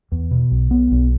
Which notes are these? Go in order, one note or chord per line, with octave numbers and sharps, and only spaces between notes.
E2
B2
B1
B3
B1